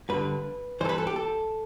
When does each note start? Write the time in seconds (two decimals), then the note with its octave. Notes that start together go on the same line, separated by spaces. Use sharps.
0.09 G2 D3 B4
0.81 G2 E3 A4 C5
0.89 B4
0.98 A4
1.07 G4
1.16 A4